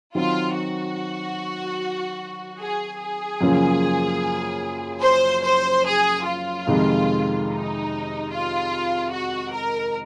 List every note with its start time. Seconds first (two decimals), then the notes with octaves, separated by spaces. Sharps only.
0.15 D#3 F#3 C4 F4
0.56 F#4
2.60 G#4
3.00 G#4
3.41 F#2 C#3 F3 A#3 F4
5.03 C5
5.44 C5
5.85 G#4
6.26 F4
6.67 F2 C3 D#3 G#3
7.47 D#4
8.30 F4
9.11 F#4
9.51 A#4